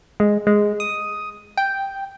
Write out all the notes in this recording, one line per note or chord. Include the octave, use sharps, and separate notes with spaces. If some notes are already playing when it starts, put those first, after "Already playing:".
G#3
G#3
D#6
G5